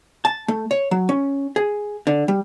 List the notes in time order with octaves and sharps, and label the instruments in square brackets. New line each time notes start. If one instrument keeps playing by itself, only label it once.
[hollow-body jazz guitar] A5
A3
C#5
F#3
C#4
G#4
D3
G3